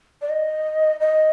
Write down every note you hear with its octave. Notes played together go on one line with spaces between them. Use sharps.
D5
D#5
D#5